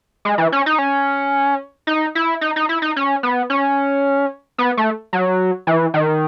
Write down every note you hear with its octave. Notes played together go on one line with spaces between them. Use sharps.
G#3
E3
C#4
D#4
C#4
D#4
E4
D#4
D#4
E4
D#4
C#4
B3
C#4
B3
A3
F#3
E3
D#3